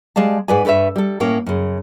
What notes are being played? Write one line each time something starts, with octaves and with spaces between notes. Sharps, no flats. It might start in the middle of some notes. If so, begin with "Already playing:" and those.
G3 G#3 D5 F5 A5
G#2 G#4 B4 D5 G#5
G2 A4 B4 C#5 E5
G3 A4
A2 A#3 C#4 C#5
F#2 C#3